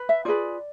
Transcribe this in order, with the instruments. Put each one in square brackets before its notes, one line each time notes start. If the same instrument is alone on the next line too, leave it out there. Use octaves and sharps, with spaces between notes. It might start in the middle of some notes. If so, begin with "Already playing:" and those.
Already playing: [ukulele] B4
E5
F4 G#4 B4 D5